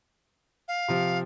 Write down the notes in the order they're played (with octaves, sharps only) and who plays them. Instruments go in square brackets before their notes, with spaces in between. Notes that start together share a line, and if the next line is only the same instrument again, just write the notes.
[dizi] F5
[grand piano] C3 F3